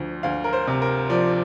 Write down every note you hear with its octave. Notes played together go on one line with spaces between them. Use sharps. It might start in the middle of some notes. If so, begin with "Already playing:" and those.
Already playing: D2 F3
D2 F5
A#4
C5
C3
A#4
F3 D5